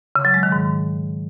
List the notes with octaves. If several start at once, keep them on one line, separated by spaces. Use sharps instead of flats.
C#3
F#3
G#3
D#3
G#2